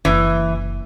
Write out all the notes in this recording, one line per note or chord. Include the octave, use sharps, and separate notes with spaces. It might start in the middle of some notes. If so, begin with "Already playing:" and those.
F#1 E3